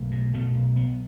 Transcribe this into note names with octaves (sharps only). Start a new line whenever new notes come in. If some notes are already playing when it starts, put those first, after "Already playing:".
Already playing: B1 A3
B2
B2 A3
B1
B1 B3